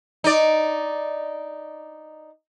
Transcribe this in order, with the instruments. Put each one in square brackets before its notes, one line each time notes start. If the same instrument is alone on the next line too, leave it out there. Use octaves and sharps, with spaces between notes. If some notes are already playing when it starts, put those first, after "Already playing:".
[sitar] D#4 D5